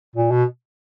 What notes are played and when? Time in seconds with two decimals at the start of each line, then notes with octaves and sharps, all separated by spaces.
0.16 A#2
0.31 B2